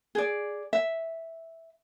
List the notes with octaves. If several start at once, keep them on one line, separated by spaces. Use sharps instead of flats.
G#4 D5
E5